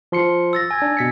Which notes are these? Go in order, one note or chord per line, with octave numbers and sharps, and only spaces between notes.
F3 C6 C#7
E6 A6 A#6
G#5 G#6
D4
B2 B6 C#7